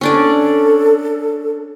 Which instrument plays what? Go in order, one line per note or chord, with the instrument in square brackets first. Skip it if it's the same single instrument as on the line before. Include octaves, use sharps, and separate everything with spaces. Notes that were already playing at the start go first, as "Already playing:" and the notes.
[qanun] C#4 D4 D5 [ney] A4